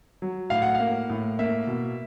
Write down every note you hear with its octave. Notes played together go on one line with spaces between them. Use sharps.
F#3
A2 F5
F#5
A#3 F5
A2
A#3 E5
B2